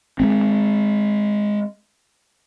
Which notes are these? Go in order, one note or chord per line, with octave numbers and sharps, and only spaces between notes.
G#3 A3 C4